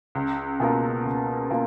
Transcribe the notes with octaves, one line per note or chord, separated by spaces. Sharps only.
C#2
B2 A#3 F4 A#4
C#2
B2 A#3 F4